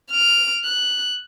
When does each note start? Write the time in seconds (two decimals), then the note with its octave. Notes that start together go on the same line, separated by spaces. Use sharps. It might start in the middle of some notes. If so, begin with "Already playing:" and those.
0.11 F6 D7
0.64 F#6